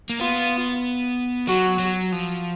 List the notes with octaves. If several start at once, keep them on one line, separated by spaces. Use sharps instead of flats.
A#3
B3 F4
F#3 F#4
F#3
F3